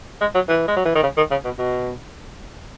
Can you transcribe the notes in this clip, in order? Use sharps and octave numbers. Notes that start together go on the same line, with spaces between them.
G#3
F#3
E3
G#3
F#3
E3
D#3
C#3
D#3
C#3
B2
B2